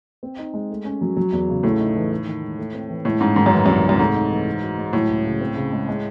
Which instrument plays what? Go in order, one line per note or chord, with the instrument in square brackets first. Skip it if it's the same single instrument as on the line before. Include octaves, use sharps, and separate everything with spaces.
[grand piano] C4
D#4
G#3
A3
C#4
F#3
F#3
E2
C#3
[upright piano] A2 [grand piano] A3
[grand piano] D#4
E3
D#4
D#3
G#3
A3
C4
E3
[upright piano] A2 [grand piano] G#3
[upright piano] G#2 [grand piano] C#4
[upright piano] G#2 [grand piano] D#3
[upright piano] F#2
[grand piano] E3
[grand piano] C2 [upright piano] F#2
[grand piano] C3
[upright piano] F#2
[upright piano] G#2 [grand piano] A3
[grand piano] D#4
E3
D#4
F#4
G#3
[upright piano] A2 [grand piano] F#3
[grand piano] C#2
C#3
C4
C#3
G#3
G#3